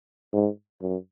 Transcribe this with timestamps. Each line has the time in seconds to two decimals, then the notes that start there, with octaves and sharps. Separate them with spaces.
0.33 G#2
0.81 F#2